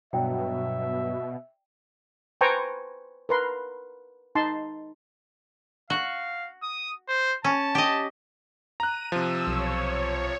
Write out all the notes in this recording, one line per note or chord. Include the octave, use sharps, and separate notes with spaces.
G2 B2 F#3 D5 E5 G5
B4 C5 G5 G#5 A#5 C#6
A#4 B4 C6
D#4 A5 C6
F#4 F5
D#6
C5
C#4 A5
G4 D#5
A#5 F#6 D#7
C3 F3 E6
B1 C#5